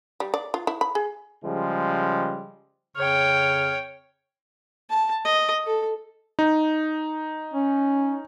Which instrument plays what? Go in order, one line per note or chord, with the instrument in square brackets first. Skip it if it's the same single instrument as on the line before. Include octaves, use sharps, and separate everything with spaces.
[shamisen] G3
D5
F4
E4
B5
G#4
[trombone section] C#3 F3 G3 G#3
[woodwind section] F2 C#3 F6 [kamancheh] C#5 G5
[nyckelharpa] A5
D#5
A4
[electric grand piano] D#4
[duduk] C#4